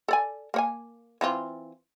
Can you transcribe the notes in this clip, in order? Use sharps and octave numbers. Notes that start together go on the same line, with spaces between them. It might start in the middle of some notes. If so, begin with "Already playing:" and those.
A4 D5 G#5
A#3 C#5 G#5
E3 C4 F4